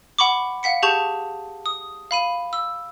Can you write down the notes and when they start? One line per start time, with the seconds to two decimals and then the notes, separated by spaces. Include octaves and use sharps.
0.18 F#5 B5 C#6 D6
0.63 F5 F#5 B6 C#7
0.83 G4 G#4 A5 C#6 G6 F7
1.66 D#6
2.11 F5 B5 D#7
2.53 E6